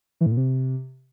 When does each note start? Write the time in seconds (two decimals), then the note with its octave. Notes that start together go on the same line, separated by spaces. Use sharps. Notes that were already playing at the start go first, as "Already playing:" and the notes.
0.21 E3
0.26 A2
0.32 A#2
0.37 C3